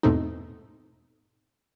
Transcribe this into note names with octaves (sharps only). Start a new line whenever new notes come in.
E2 G#2 B2 A3 C4 D#4